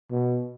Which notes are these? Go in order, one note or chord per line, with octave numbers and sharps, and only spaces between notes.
B2